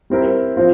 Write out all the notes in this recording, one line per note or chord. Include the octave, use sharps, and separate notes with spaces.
G3 C4 E4 A#4
F3 C4 F4